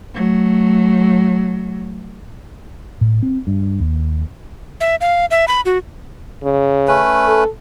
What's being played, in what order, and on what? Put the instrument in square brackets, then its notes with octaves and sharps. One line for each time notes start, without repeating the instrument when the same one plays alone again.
[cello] F#3 A3
[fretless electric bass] A2
C4
G2
D#2
[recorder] E5
F5
E5
B5
F#4
[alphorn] C#3
[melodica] A3 C#4 B4
[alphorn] A4